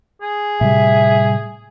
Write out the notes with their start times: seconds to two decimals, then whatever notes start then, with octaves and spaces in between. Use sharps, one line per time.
0.22 G#4
0.61 A2 C3 G3 E5